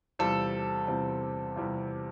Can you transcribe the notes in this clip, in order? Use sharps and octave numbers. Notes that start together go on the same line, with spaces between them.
E2 C3 G3 C4 F4 A4
E2 C3 G3 C4 F4
E2 C3 G3 C4 F4